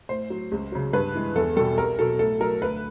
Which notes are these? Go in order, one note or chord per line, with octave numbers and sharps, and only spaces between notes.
A2 C5
F#3
C#2
C#3 F#3
G2 B4
E3 G#3
E2 A4
B2 G3 A4
C2 A#4
B2 F#3 A4
A2 A4
F#3 A#4
D2 B4